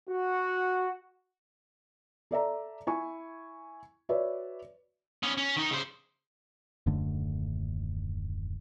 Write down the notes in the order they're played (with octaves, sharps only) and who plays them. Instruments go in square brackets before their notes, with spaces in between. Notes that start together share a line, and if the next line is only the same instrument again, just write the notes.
[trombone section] F#4
[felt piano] A4 D5 E5 A#5
E4 G#5 C#6
F#4 B4 C#5 D5 E5
[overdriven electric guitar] B3 C#4
C#4
D#3 D#4
C#3 C5
[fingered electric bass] D#1 F#2 D3 A3